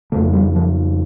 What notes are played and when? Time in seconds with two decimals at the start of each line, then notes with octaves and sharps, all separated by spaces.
0.12 F2 C#3 A3
0.27 A3
0.33 G3
0.55 F3